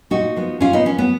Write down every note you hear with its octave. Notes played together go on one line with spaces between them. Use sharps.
A#2 D#4 F#4
F3 B3
A#2 C#4 F4
B3 D#4
F3 B3 C#4
B3